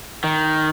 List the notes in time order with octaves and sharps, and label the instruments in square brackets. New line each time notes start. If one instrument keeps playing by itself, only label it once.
[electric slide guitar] D#3